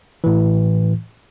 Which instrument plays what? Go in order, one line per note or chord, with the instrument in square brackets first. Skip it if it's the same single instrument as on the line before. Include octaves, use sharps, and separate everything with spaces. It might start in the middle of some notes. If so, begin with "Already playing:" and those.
[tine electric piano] A2 E3